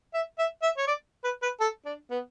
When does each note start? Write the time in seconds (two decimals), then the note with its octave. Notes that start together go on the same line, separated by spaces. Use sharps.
0.14 E5
0.39 E5
0.62 E5
0.77 C#5
0.87 D5
1.24 B4
1.42 B4
1.61 A4
1.86 D4
2.11 B3